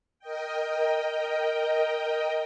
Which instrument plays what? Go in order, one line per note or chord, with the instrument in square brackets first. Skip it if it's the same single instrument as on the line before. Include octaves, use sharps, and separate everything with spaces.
[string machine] A#4 D#5 G5